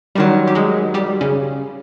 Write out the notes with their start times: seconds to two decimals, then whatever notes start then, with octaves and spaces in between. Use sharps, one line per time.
0.15 F#2 D#3 F#3 G3 G4
0.47 G4
0.55 G#3 G#4
0.94 G3 G4
1.21 C#3 C#4